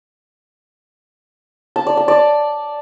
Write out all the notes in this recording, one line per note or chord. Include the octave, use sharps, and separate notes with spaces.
A5
D5
A5
D5